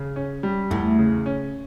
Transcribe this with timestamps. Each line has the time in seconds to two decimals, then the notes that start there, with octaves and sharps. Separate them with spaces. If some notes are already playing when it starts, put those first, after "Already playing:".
Already playing: C#3
0.16 C#4
0.43 G3
0.70 E2 A3
0.99 C#3
1.26 C#4